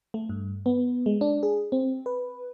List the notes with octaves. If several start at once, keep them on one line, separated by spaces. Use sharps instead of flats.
A3
G2
B3
G#3
D4
G#4
C4
B4